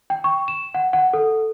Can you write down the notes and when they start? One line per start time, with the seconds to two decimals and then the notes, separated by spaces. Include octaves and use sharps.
0.10 G5
0.24 C#6
0.48 E7
0.74 F#5
0.93 F#5
1.13 A4